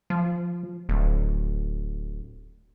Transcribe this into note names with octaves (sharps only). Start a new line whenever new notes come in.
F3
D1